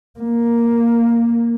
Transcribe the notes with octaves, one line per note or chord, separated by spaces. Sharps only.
A#3